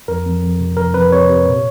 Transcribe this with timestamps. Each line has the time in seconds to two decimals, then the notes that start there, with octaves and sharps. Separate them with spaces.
0.08 F2 A#4
0.25 F2
0.43 F2
0.60 C3
0.77 F2 A#4
0.94 F2 B4
1.12 C3 C#5
1.29 C3
1.46 A#2